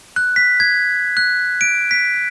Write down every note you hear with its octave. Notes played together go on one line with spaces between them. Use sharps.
F#6
B6
G#6
F#6
D7
B6